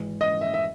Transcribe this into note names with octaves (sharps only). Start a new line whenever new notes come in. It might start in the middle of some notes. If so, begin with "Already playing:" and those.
Already playing: G#1 G#2 E3
D#5
E5
E5